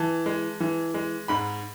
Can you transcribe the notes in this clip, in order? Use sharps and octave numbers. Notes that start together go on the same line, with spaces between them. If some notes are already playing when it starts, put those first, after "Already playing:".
Already playing: E3 A5
G#3
E3
G#3
G#2 B5